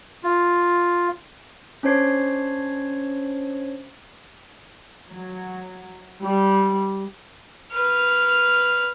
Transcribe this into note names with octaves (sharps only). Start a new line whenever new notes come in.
F4
C#4 D4 C5 C#5 C7
F#3
G3
B4 F6